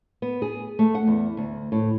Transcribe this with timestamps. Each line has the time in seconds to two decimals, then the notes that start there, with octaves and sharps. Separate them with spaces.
0.22 B3
0.42 G#4
0.79 A3
0.95 F#5
1.07 E2
1.37 D2
1.72 A2